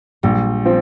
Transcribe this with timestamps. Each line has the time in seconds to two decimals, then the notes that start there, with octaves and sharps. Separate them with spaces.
0.23 A#1 G3
0.65 F3 C4